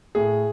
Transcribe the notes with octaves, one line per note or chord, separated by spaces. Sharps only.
A2 G#4